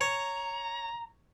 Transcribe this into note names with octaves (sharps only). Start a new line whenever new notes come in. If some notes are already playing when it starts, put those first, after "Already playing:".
C#5 A#5